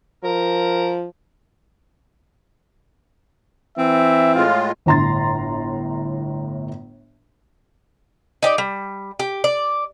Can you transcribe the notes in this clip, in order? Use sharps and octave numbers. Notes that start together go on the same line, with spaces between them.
F3 A#4
E3 C4 E5
A2 G#3 F4 F5
G1 A2 A#5 C6 A6
D#4 G4 D5
G3
G4
D5